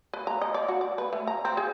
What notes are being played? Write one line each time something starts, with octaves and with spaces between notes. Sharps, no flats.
B4
A#5
D#5
D5
F#4
D5
B4
A3
A#5
C4
G#4